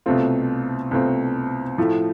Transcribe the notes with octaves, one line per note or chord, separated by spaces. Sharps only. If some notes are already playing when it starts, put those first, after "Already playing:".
C2 B2 A3 C4 F4
C2 B2 A3 C4 F4
A2 F3 A3 E4